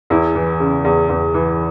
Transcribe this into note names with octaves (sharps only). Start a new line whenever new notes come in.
E2 E4
E3
C#3
E2
E2
E3